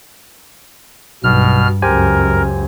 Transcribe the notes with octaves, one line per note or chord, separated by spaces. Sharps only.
B1 G2 B2 F6
C#2 F#2 G4 A#4 C5 G#5